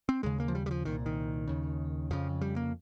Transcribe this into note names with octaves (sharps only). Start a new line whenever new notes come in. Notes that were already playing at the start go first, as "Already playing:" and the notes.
C4
D#2 C#3 G#3
A#3
F3
G3
G3
F3
C2 A#2 D#3
D#3
D#2 C#3
F2 C#3 F3
G3
A#3